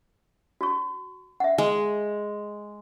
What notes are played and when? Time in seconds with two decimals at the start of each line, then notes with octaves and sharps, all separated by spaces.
0.61 F#4 C#6
1.40 E5 F#5
1.58 G#3